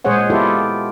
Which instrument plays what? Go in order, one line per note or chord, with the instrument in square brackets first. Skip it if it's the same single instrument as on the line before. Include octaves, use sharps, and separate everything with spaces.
[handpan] A#2 G#3 G#4 C5 C#5 F#5
B3 E4 F4 G4 A4